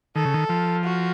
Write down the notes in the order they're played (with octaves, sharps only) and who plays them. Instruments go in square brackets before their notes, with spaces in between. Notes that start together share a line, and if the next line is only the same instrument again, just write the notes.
[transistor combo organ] D#3 [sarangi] A4
[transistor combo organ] C#3
D#3
F3
[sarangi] F#4